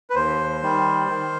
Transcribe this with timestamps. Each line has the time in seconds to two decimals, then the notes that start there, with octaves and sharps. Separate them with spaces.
0.10 B4
0.15 D#2 C5
0.62 D#3 G3
1.10 D#3